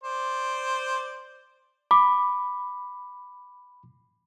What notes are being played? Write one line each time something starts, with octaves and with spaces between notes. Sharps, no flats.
C5 D5
B5 D6